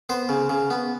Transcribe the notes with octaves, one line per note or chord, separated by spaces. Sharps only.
B3 C5
C#3
C#3
B3